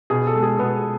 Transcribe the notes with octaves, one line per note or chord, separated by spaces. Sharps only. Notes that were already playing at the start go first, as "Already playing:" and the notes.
B2 G#4
A4
G#3
G#4
B2 B3